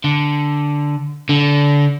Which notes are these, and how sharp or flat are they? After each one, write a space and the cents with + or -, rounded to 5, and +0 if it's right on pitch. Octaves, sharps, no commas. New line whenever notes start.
D3 -5
D3 -25